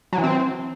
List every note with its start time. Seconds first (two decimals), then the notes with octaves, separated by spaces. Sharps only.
0.13 F#3
0.18 E3
0.24 C4